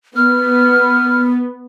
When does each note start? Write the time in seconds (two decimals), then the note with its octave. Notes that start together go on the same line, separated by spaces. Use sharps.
0.16 B3 F6